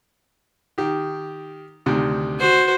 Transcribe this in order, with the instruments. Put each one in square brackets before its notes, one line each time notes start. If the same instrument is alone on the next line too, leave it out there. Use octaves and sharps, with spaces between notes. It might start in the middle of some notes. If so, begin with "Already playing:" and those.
[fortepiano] D#3 G4
D2 C3 D#3
[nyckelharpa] F#4 C5